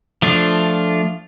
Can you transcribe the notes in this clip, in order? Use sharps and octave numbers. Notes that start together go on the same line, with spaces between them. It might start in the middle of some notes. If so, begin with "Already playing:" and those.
F3 A3 D4 F4